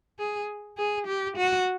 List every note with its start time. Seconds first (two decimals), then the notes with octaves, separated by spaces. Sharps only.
0.19 G#4
0.78 G#4
1.07 G4
1.37 F#4